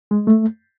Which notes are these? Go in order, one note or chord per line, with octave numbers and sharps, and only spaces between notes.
G#3
A3